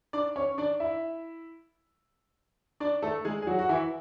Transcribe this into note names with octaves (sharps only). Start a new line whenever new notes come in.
D4 D5
C#4 C#5
D4 D5
E4 E5
D4 D5
A3 A4
G#3 G#4
G#4
F#3 F#4
F#4
E3 E4